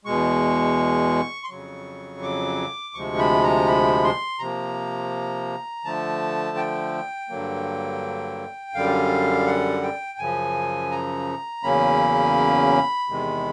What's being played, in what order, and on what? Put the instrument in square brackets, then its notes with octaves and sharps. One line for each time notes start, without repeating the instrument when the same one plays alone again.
[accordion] E2 B2 G#3 C#6
C6
F2 C#3 F#3 C#6
D6
D2 C3 F3 G#3 C#6
B5
A#5
B5
C6
C3 F3 A#3 A#5
D3 F3 A3 A5
G5
G2 D3 F#3 A#3
F#2 D3 G3 F5
F#5
G5
F#2 C#3 F3 G#5
A#5
E2 C#3 F#3 A#3 C#4 B5
E2 C3 D#3 G#3